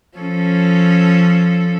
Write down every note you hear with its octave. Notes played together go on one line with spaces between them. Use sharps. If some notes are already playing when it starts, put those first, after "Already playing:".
F3 C#4 A4